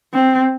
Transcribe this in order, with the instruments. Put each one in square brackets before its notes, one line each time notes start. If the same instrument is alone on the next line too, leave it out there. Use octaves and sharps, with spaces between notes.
[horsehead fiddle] C4